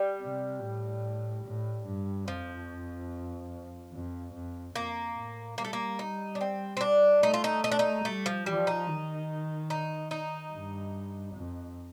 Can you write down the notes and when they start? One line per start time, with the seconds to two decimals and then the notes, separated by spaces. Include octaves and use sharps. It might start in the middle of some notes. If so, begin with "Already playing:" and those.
Already playing: G3
0.21 C3
0.62 A2
1.45 A2
1.86 G2
2.27 F2 F3
3.92 F2
4.34 F2
4.74 F2 A#3
5.17 A2
5.57 G3 A#3
5.65 A3
5.73 A#3
5.99 D#4
6.35 D4
6.41 C4
6.77 C4
6.81 D4
7.22 A3 D#4
7.34 F4
7.44 D#4
7.64 D#4
7.72 D4
7.79 D#4
8.05 G3 A3
8.26 F3
8.46 F3 G3
8.67 D#4
8.87 D#3
9.70 D#4
10.11 D#4
10.52 G2
11.35 F2